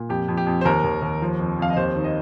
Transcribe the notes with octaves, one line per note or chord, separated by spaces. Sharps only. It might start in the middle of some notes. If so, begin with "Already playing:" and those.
Already playing: A#2
F2 G4
F2
G4
F2
C5
D#2 A#4
D#2
D#2
F3
F2
F2 F5
D#5
D#2 C5
D#3
D#5